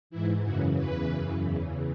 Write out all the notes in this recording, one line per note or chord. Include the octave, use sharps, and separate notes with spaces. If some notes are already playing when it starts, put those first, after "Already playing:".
G#2 E3 E4
F#2 C#3 E3 F#4
E2 C#3 E3 B4
F#2 C#3 E3
E2 C#3 E3